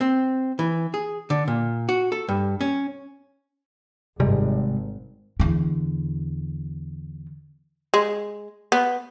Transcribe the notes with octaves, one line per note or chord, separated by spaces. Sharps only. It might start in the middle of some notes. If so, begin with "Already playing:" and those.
C4
E3
G#4
D3
A#2
F#4
A4
G2
C#4
G#1 C3 G3 G#3
E2 D3
G#3
B3